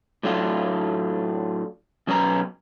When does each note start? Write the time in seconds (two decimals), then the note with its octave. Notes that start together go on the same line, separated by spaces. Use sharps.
0.23 A2 F#3 A3 D4 F4
2.07 B2 F#3 C#4 B4 C#5 A#5